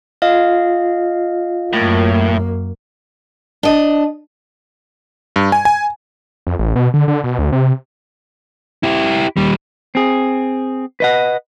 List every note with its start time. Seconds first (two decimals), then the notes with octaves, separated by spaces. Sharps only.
0.22 F4 D#5 F5
1.73 F#2 A2 A#3
3.63 D4 D#5
5.36 G2
5.52 G#5
5.65 G#5
6.47 F2
6.59 A1
6.76 B2
6.94 D3
7.08 D3
7.24 B2
7.39 D2
7.52 C3
8.83 E4 G4
9.37 D#2 G3
9.95 C4 G#4
11.00 B4 D#5 F#5